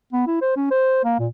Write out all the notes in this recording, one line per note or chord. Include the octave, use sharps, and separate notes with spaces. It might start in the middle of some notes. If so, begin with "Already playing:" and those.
B3
E4
C5
C#4
C5
A#3
A#2